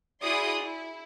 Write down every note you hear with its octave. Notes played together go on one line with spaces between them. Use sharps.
E4 F#4 G#4 D5 C6 D#6
E4